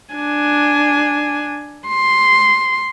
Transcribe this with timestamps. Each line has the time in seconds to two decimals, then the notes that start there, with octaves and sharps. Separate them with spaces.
0.14 D4 G#5
1.88 C6